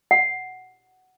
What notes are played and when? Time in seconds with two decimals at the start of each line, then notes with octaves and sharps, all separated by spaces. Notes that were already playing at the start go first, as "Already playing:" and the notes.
0.11 F#5